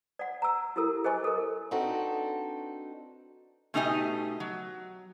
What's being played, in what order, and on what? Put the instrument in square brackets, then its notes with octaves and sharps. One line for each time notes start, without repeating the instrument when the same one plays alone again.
[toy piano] D5 F#5
A#5 E6
E4 G4 A4 A#4 E6
G#4 C5 D#5 G#5 C#6
A4 A#4
[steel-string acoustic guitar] C4 D4 D#4 F#4 A4 B4
[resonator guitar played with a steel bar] B2 A3 D#4 G4 D#5 G#5
F#3